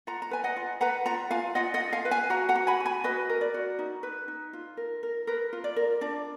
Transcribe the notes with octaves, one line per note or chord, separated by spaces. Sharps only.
F4 F#5 A#5
A#5
B4 G#5
D#5 F#5
F4
B4 F#5 A#5
F4 F#5 A#5
F4 F5 G#5
F4 D#5 F#5
D#5 F#5
F4
F5 G#5
B4
F5 G#5
F#4 F#5 A#5
F#5 A#5
F#4
G#5 B5
F#4
G#5 B5
F#4 B4 D#5
A#4
D5
F#4
D#4
B4
D#4
F4
A#4
A#4
A#4 B4
F4
D5
A#4
D4 D5